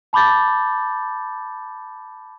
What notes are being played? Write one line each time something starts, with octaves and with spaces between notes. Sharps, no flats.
A5 B5 D6 G6 A6